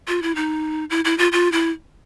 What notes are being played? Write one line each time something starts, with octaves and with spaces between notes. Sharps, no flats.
F4
E4
D#4
E4
E4
F4
F4
E4